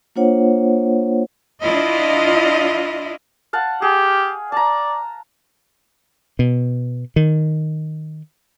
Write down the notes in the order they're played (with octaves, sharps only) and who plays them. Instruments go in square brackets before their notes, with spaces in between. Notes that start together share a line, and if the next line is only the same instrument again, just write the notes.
[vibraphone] A#3 D4 F4 C5 C#5 F#5
[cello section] D4 E4 F4 D#5
[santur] F5 F#5 A5
[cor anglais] G4 [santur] G#4
[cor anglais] D5 [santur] A5 A#5
[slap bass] B2
D#3